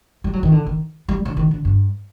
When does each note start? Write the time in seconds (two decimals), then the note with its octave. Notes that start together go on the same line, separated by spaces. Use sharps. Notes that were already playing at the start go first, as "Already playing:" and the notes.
0.24 G3
0.33 F#3
0.43 D#3
0.52 D3
0.66 D#3
1.08 G3
1.25 D3
1.37 D#3
1.51 D3
1.65 G2